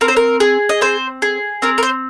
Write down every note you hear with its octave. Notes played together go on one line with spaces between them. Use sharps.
C4 A#4
C5
A#4
G#4
D#5
C4 C5
G#4
C4 A#4
A#4
C5